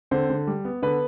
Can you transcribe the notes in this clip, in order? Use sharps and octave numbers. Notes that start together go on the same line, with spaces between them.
D3 C4 C5
D3
G3
B3
D3 B3 B4